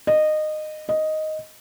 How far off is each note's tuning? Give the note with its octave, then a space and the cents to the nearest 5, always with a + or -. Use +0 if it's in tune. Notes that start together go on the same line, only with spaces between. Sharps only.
D#5 -20
D#5 +0